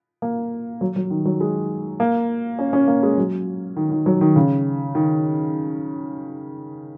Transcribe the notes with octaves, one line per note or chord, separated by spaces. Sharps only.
A#3
F#3
F#3
D#3
F#3
G#3
A#3
C#4
C#4
A#3
G#3
F#3
D#3
D#3
F#3
D#3
C#3
D#3